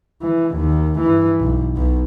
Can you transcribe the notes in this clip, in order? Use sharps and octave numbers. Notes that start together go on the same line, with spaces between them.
E3
D#2
G2 E3
B1
B1 B2